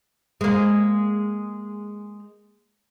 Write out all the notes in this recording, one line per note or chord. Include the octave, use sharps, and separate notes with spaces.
G#3 A#3